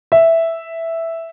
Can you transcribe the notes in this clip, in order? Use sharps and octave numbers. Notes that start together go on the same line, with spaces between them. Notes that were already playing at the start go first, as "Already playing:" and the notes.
E5